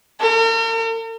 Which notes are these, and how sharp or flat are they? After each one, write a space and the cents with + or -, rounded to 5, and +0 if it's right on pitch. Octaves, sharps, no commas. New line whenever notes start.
A#4 -45